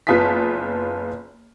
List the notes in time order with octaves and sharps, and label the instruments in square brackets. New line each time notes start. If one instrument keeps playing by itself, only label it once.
[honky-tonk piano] F#1 B3 F4 A5 D#6 B6